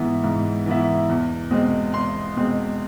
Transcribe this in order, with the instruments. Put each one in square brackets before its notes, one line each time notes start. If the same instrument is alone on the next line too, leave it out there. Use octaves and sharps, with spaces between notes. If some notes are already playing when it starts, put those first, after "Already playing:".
Already playing: [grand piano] G#2 E3 B3 E4
G#2
E3 B3 E4
E2
B2 G#3 C4
E2 C6
B2 G#3 C4